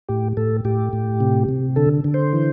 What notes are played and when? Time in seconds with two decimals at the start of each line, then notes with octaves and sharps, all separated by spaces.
0.09 A2 G4
0.37 A2 A4
0.65 A2 G4
0.93 A2
1.20 C3
1.49 C3
1.76 D3 A4
2.04 D3
2.14 C5
2.33 E3